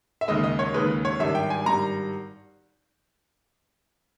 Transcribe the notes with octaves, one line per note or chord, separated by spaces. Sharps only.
E5
D#2 C#3 G#3 D#5
D#5
C#5
D#2 C#3 G#3 B4
C#5
G#1 G2 G3 E5
G5
G#5
G#1 G2 G3 A#5